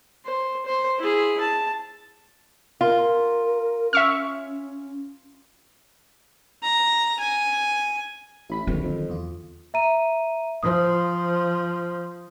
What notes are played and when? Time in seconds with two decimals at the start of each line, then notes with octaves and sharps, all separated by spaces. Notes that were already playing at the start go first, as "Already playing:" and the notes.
0.25 C5
0.66 C5
0.99 E4 G#4
1.40 A5
2.81 F4 A#4
3.93 C#4 E5 C#6 F6
6.63 A#5
7.19 G#5
8.50 A1 E4 B5 B6
8.67 A#1 D3 D#3 F#3 C4
8.83 F2
9.09 E2 F4
9.74 E5 A#5 D#7
10.63 F3 C5 D#6